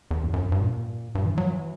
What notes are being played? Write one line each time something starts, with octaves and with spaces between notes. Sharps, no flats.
E2
F#2
F#2
G2
A#2
G2
E3
F#3
E3